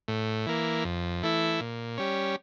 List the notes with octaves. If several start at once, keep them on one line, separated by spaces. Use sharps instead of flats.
A2
E3 A#3
F2
E3 A3 E4
A#2
G3 C#4